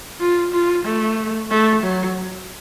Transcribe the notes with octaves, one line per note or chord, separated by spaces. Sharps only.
F4
F4
A3
A3
F#3